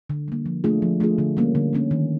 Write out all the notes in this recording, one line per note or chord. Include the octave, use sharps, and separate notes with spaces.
D3
G3 A#3
F3
A3 D4 F4 G#4
F3
A3 D4 F4 G#4
D3
G3 A#3 C#4
D3
G3 A#3 C#4
D#3